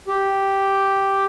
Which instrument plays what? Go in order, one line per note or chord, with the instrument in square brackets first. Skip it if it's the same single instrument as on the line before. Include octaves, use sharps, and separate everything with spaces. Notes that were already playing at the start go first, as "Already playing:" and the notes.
[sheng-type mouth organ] G4